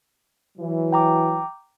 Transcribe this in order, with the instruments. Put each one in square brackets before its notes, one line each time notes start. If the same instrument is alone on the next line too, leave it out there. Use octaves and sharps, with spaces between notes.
[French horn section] E3 F#3
[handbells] G5 A#5 D6